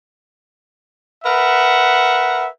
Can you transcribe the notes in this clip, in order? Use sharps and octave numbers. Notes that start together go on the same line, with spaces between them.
A#4 B4 E5 F#5